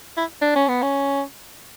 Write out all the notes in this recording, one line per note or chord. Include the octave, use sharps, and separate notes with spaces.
E4
D4
C#4
B3
C#4